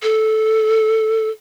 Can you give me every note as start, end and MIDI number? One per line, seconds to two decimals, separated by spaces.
0.03 1.30 69